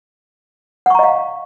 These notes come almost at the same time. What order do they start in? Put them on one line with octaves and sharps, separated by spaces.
F#5 C#6 A#5 D#5 F5